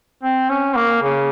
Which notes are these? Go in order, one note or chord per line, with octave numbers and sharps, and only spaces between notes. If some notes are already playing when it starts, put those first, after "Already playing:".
C4
C#4
A#3
C#3